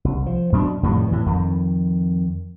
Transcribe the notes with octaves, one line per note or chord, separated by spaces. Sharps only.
C2
F3
F#2 B2 D4
F2 A2 D#3 G3
A2 E3
F2 D#3